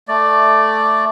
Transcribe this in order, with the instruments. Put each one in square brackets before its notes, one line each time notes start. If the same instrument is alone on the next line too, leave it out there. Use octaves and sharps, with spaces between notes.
[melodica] A3 D5